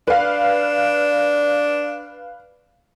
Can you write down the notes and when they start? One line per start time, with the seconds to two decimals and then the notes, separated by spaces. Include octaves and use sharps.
0.07 D4 B4 F5